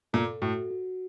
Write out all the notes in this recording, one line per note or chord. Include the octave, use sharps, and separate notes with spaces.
A#2 A4
A2 F#4
F#4